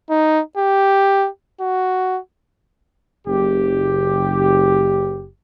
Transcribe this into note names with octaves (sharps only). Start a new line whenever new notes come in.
D#4
G4
F#4
F#1 G4